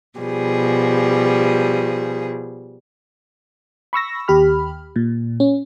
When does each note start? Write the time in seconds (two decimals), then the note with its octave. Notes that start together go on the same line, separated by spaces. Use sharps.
0.18 B2 F3 G3 G#4
3.93 B5 C#6 E6 A#6
4.28 D#2 G4 B5 F6
4.96 A#2
5.40 C#4